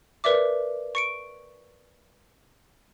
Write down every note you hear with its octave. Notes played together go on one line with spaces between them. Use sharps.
A#4 B4 D5 E5 D6
C#6 C#7 D7